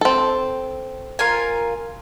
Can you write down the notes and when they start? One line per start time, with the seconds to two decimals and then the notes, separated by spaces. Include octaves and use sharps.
0.01 C4 A4
1.19 F4 A#4 G#5